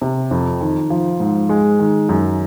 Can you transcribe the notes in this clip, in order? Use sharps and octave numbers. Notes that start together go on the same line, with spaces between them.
C3
F2
D#3
F3
G#2
G#3
D#3
F#2